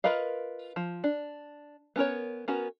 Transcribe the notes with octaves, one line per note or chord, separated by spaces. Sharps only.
F4 A#4 B4 D#5 F5
F3
D4
B3 C#4 A#4 C#5
B3 C#4 F#4 A#4